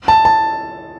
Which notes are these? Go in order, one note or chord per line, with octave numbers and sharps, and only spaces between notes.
A5
A5